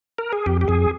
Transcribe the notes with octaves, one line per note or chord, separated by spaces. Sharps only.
A#4
G#4
F2 G4
G4
F2 G#4